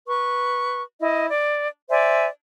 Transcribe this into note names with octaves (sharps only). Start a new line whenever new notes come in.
B4 C#6
E4 D#5
D5
C5 D5 E5 G#5